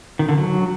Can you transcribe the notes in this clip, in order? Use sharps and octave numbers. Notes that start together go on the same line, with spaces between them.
D#3
D3
F#3